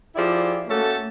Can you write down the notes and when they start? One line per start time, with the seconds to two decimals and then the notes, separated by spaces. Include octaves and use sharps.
0.16 F3 E4 G4 G#4 D5
0.67 A3 A#3 C#4 F#4 A4